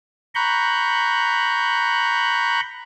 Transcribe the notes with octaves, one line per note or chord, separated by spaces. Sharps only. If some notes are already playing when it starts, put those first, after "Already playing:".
A#5 B5 C#6 F#6 G6